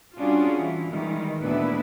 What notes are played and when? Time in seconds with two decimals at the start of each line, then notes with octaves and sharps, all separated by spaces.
0.18 G3 C#4 D4 F4 F#4 G#4
0.59 E3
0.90 D#3 E3 G3 G#3
1.42 D2 A#2 B3 D4 E4 B4